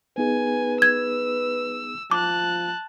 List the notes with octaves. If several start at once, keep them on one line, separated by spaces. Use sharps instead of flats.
B3 D#4 G#4 B4 G#5
E6 G#6
F3 A5 D6 F#6